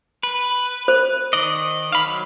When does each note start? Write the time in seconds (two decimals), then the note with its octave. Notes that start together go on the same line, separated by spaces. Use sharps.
0.23 B4
0.88 C5
1.33 D#3 D5 D#5
1.92 F5 B5
2.05 F#3